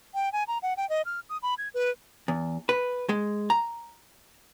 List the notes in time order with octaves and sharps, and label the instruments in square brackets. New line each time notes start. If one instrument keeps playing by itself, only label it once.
[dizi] G5
G#5
A#5
F#5
G5
D#5
F6
D#6
B5
G#6
B4
[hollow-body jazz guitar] E2
B4
G#3
A#5